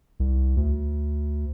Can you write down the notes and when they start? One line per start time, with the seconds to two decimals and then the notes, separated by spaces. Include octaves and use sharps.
0.20 C2
0.57 D2